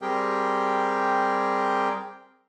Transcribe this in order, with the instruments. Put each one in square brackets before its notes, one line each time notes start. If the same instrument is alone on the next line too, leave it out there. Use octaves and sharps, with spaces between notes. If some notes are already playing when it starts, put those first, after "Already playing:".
[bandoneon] G3 C4 G4 G#4 A#4 G5